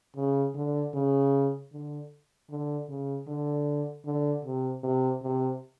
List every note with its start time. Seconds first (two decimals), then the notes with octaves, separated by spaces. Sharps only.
0.16 C#3
0.55 D3
0.94 C#3
1.72 D3
2.50 D3
2.88 C#3
3.28 D3
4.05 D3
4.45 C3
4.83 C3
5.22 C3